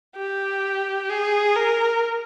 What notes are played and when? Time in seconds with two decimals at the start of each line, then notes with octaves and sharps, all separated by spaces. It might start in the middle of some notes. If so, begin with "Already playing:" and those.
0.16 G4
1.10 G#4
1.56 A#4